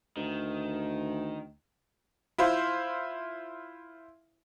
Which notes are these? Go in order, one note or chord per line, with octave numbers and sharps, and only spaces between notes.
D2 D#3
E4 F4 C5